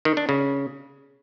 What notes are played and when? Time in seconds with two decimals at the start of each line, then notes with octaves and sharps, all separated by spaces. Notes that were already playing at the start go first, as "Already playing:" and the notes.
0.05 D#3
0.17 D4
0.29 C#3